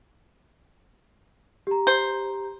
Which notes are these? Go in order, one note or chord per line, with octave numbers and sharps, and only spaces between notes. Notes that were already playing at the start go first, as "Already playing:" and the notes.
G4 A#5
C5